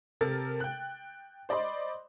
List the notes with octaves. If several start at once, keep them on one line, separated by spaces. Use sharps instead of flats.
C3 A4 A#4 A6
G5 F#6
C5 D5 D#5 B5 C6